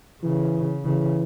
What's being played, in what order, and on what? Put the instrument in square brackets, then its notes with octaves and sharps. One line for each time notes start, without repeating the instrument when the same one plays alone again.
[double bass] C#3 [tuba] E3
[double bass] C#3 [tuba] E3